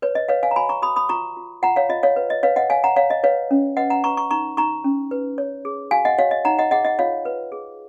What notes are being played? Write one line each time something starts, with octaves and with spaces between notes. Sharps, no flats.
B4 C#5
D#5
B4 C#5 F5
F5 G#5
A#5
F#4 G#5 B5
A#5 C#6
F#4 B5 D#6
B5 D#6
F4 A#5 C#6
F4
F4 F#5 A#5
C#5 F5
F4 D#5
C#5 F5
B4
D#5
B4 C#5 F5
D#5 F#5
C#5 F5 G#5
F#5 A#5
C#5 F5
D#5
B4 C#5 F5
C#4
B4 D#5 F#5
F#5 A#5
B4 A#5 C#6
A#5 C#6
D#4 A#5 C#6
D#4 A#5 C#6
C#4
B4
C#5
G#4
F#4 F5 G#5
D#5 F#5
F#4 C#5 F5
D#5
D#4 F#5 A#5
D#5 F#5
G#4 D#5 F#5
D#5 F#5
F4 C#5 F5
B4
G#4